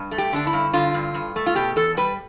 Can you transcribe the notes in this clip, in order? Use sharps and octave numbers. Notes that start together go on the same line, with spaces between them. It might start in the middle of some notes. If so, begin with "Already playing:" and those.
Already playing: G2
A3
G4
D3 D4
E4
G2
D3 F4
G2
G2
A3
F4
B2 G4
E2 A4
G3 B4